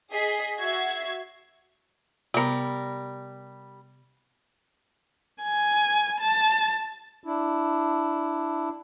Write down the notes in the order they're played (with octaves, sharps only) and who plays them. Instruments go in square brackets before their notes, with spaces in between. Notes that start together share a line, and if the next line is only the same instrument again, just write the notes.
[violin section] G#4 D#5 B6 C7
F#4 E5 G#6 C7
[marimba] C3 B3 [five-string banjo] G3 A#4
[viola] G#5
A5
[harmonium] D4 E4